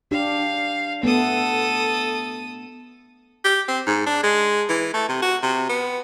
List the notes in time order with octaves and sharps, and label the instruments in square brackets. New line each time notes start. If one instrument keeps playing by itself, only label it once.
[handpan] D4 G4 [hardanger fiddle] F5
[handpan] A3 B3 [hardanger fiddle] A4 D#6
[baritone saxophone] G4
C4
G#2
D4
G#3
E3
A3
C3
F#4
C3
B3